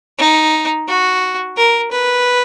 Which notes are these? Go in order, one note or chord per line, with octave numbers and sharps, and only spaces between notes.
D#4
F#4
A#4
B4